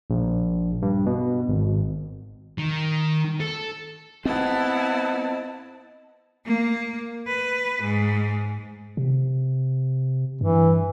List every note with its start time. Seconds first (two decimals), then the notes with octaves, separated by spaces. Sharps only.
0.10 A#1
0.82 G2
1.06 B2
1.49 G#1
2.58 D#3
3.40 A4
4.25 B3 C4 E4 C5 D#5 A5
6.45 A#3
7.26 B4
7.81 G#2
8.97 C3
10.41 G2 E3